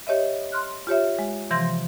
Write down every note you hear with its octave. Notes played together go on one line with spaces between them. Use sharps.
G4 C#5 D#5 E5
C6 F6 F#6
F4 G4 C#5 E5
G#3
C3 E3 F3 C6 G6 A#6